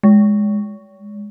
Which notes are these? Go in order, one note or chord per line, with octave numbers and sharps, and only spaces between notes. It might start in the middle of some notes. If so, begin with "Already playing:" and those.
G#3